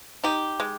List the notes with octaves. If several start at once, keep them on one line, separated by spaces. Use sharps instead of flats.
D#4 G4
G#3